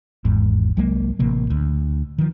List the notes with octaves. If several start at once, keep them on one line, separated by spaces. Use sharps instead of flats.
G#1 E2 G#2
C2 F#3 G#3 A#3
A1 C3 A#3
D2
D#3 F3